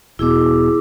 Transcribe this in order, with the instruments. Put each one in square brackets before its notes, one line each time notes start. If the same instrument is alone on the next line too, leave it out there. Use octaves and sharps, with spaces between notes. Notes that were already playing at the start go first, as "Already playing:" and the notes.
[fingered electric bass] E1 B2 [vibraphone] E4 G#4 D6